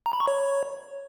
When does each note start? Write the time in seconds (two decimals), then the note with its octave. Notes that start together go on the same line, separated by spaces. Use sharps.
0.06 A#5
0.13 B5
0.20 C#6
0.27 C#5